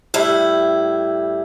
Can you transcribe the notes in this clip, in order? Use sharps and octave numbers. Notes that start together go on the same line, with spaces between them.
A2 G3 E4